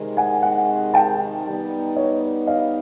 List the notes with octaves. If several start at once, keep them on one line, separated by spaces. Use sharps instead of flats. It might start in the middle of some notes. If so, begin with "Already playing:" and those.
Already playing: C3 D#3 G#3
F#5 G#5
F#5 G#5
G5 A5
G3 B3 D#4
C#5 D#5
D#5 F5